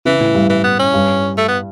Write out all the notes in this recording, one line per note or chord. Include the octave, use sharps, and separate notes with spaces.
C#3 E3
A2
G2
E3
B3
C#4
G2
A3
B3